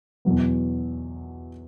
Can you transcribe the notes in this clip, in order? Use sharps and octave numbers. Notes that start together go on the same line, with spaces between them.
E2 B2 F#3 B3